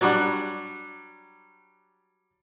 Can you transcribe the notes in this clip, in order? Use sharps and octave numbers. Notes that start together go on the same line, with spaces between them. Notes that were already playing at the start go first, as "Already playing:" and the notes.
F#3 G3 D4 D5 F#5